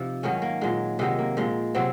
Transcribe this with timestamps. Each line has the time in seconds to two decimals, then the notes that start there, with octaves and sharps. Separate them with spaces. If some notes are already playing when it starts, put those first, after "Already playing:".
Already playing: C3 F3 D#4
0.23 G#2 D#3 F#3 C#4
0.42 A#3
0.61 A#2 F#3 G#3
0.99 C3 D#3 F#3 G#3
1.19 A#3
1.37 A#2 F3 G#3
1.75 C3 F#3 C4